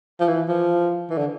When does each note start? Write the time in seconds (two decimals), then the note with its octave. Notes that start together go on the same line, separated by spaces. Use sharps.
0.20 F3
0.28 E3
0.48 F3
1.10 E3
1.18 D3